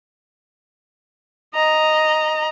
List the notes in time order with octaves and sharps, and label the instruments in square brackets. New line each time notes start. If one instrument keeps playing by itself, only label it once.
[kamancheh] D#5 A#5